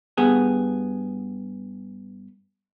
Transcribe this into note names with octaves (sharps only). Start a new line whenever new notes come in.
G2 B3 G#4